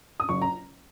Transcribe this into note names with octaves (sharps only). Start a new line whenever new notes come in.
D#6
F#1 C#6
A#5